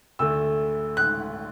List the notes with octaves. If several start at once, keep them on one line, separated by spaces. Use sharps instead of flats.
D2 D3 A3 E6
F#6